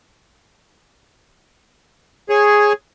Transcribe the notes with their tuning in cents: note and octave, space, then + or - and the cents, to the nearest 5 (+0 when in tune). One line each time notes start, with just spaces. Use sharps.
G#4 +0 C#5 -15